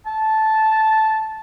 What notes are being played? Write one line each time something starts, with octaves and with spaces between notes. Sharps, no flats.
A5